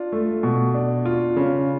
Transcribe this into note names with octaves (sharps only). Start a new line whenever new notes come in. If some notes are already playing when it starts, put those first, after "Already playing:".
Already playing: D4 F4
A3
B2
D4
F4
C#3